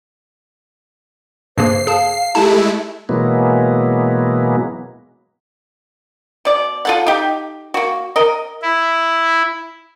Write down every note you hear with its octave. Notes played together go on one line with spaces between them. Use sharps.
G2 C#3 A#3 C5 C7
G#4 F5 A5
G#3 A3 E4 G4 A5
B2 E3 F#3 G#3 A#3 B3
B2 D5
F4 A4 F#5
D#4 G4
A#3 F#4
A#4 D#5
E4